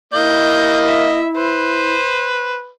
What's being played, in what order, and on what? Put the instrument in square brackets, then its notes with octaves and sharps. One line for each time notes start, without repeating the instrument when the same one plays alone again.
[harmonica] A#3 D#5 [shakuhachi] E4 [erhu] G6
[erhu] E5
[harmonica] B4 [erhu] C5